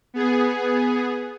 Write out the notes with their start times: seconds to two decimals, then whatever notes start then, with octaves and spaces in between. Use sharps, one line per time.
0.14 B3 G#4